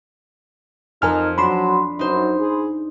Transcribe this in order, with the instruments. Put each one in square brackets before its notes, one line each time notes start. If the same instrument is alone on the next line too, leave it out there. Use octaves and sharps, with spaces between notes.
[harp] F2 [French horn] D#4 [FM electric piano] A#4 G#5 F6
[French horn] F#3 [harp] D4 E7 [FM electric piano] B5 C6
[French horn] F#2 [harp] D#4 C5
[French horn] G#4